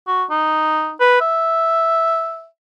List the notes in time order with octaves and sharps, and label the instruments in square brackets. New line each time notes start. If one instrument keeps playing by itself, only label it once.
[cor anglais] F#4
D#4
B4
E5